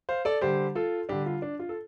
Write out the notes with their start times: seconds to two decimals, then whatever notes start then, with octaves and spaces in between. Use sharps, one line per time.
0.09 C5 F5
0.25 A4 D5
0.41 D3 G3 G4 C5
0.75 F4 A4
1.09 D3 G3 D4 G4
1.26 F4
1.42 D4
1.59 F4
1.69 A4